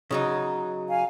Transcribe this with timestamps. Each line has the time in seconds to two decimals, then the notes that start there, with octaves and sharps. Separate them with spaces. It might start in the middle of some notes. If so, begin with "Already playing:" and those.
0.11 C#3 F#3 D#4
0.89 F5 G#5